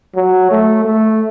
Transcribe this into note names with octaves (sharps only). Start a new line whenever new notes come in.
F#3
A3
A3